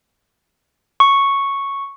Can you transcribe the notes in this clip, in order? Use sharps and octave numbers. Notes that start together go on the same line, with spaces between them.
C#6